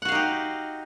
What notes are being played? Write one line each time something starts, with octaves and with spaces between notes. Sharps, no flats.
D#4 F#4 G4 F5 F#5